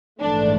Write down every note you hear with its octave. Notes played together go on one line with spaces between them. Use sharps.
A#1 G#2 E3 A3 D4